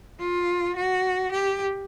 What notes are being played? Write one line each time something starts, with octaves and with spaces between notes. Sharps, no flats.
F4
F#4
G4